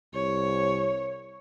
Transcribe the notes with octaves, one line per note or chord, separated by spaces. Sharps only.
C2 C#5